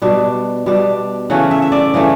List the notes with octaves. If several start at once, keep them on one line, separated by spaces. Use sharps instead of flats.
B2 G3 D4
B2 G3 D4
C#3 E3 A3 C#4 F#5
E5
E5
D5
C#3 E3 A3 C#4